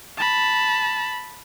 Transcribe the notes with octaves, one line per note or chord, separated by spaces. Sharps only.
A5 B5